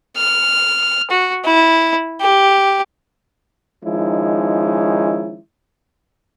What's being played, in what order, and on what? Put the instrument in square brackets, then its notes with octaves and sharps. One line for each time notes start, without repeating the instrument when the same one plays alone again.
[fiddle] F6
F#4
E4
G4
[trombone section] D#3 F3 G#3 C#4 D#4 E4